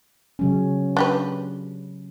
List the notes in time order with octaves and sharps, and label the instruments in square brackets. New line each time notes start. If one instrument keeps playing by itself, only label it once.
[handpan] C#3 F#3 C#4
[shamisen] D4 G4 B4